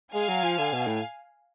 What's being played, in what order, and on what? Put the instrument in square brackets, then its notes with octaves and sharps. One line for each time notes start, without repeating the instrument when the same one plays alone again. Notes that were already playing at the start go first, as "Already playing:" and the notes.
[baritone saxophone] G#3 [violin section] F5 G#5
[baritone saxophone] F#3
F3
D3
B2
A2